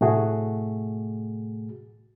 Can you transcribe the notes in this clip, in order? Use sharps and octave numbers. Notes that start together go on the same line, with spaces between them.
A2 C3 A3 F#4 G#4